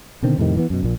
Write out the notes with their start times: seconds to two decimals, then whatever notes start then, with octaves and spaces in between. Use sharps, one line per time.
0.23 B2 D3 D#3 C4
0.38 F2 A2 C3 D#3
0.57 E3 B3
0.70 F#2 B2
0.83 A#1 A#2